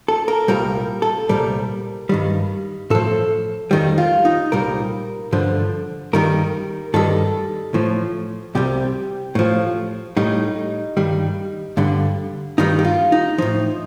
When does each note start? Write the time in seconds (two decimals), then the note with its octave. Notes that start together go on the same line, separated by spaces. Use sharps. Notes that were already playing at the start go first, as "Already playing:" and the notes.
0.08 A4
0.28 A#4
0.48 C2 A#2 G3 A#4
1.02 A4
1.29 C2 A#2 G3 A#4
2.09 G2 D#3 G3
2.90 A2 F3 A4
3.71 F2 D#3 G3
3.98 F4
4.25 D#4
4.52 C2 A#2 G3 A#4
5.32 G2 D3 F3
6.13 G2 D#3 G3 A#4
6.94 G2 D#3 G3 A4
7.74 A2 F3
8.55 C2 C3 G3 G4
9.35 A2 F3
10.17 A2 G3 D#4
10.97 G2 D#3 G3
11.77 G2 D3 G3
12.58 G2 D#3 G3 D#4
12.79 G4
12.85 F4
13.12 D#4
13.38 A2 F3 D#4